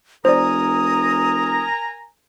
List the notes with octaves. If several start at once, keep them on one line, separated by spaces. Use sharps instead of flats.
F1 A#4 C5 D5 G#5 A#5 D#6